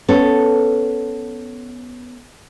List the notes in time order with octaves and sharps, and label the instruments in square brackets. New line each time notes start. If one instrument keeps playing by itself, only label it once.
[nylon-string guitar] B3 C#4 A4